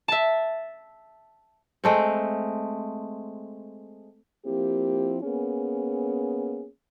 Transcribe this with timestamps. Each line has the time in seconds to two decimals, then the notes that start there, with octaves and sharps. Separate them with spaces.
0.08 E5 A5
1.84 G#3 A3 C4
4.45 F3 A#3 C4 E4 G4
5.22 A#3 B3 C#4 G#4